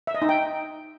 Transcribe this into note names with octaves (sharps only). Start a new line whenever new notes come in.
E5
D#5
D#4
G5